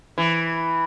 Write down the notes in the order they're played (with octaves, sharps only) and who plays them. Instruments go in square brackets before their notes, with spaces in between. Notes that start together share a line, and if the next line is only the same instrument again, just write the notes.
[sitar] E3